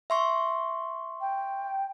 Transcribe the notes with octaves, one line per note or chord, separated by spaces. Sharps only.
E5 C6 C#6
G5